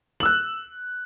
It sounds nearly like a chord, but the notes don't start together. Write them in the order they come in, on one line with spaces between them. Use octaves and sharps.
F#7 E6 F#6